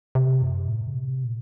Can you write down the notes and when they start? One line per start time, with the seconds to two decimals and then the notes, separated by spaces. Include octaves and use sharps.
0.15 C3
0.42 F#2
0.68 A2
0.87 C#3
0.94 C3
1.24 A#2